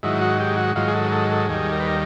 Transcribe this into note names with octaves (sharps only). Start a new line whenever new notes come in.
G#2 D#3 F#3 E4
F#4
G4
F#4
G#2 D#3 F#3 F4
G#4
A4
A4
A4
D#2 D#3 G3 G#4
A#4
B4
A#4